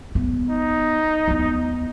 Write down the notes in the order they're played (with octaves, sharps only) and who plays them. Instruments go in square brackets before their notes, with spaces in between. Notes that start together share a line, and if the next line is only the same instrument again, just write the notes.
[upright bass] B3
[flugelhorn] D#4
[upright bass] D#2 B3